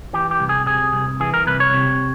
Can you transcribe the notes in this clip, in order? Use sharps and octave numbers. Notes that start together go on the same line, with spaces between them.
E3 G4
G4
C2
G#4
C3 G#4
C2
E3 G#4
A#4
C2 B4
C#5
C3